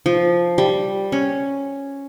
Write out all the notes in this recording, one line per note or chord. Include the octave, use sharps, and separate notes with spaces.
F3
G3
C#4